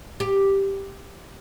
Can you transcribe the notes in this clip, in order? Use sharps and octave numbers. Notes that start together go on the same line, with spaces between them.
G4